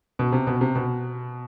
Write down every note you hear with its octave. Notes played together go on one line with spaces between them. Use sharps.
B2
C3
B2
C3
B2